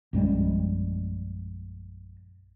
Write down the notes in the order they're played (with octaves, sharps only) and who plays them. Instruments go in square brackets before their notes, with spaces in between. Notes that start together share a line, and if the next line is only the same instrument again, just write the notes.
[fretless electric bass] A#1 F#2 G3 G#3